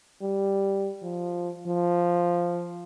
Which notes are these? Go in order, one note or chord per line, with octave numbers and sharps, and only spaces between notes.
G3
F3
F3